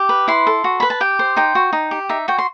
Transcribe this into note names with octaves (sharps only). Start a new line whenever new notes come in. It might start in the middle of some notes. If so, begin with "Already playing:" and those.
Already playing: G4
B4
E4 C6
A4
F#4
B4 B5
A5
G4 G5
C5
D#4 G5
F#4
D#4
G4
D#4 E5
F#4 G5
C6